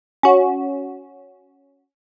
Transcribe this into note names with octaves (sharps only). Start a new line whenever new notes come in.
C#4 F#4